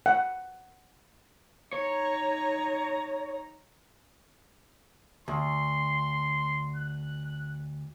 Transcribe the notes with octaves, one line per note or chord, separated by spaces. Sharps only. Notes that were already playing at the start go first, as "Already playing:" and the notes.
F#5
D#4 C#5 A#5
D2 C6
F#6